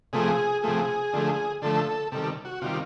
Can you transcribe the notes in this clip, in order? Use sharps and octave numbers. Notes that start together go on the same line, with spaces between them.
C3 F3 A3 G#4
C3 F3 A3 G#4
D3 F3 A3
D3 F3 A3 A4
C3 D#3 G3 A4
F#4
C3 D#3 G3 F4